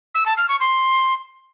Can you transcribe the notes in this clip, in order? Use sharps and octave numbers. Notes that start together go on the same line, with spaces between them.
E6
A5
F6
C#6
C6